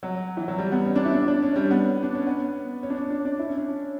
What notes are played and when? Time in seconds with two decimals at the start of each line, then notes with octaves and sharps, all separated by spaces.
0.03 F#3
0.37 E3
0.48 F#3
0.58 G3
0.72 B3
0.86 C#4
0.95 D4
1.05 E4
1.14 D4
1.28 D4
1.43 C#4
1.56 G3
1.71 B3
2.03 D4
2.15 C#4
2.27 B3
2.83 C#4
2.90 D4
2.96 C#4
3.10 D4
3.25 D4
3.39 E4
3.48 C#4
3.58 D4